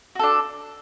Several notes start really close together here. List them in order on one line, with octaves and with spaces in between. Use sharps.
F#4 A4 D4